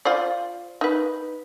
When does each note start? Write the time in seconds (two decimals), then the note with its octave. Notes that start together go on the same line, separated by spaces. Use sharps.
0.05 F4 C5 D5
0.81 D#4 B4